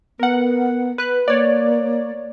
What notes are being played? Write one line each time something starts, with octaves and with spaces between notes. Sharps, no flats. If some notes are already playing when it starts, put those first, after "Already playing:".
B3 A#4 F#5
B4 F#6
A#3 C#5 D5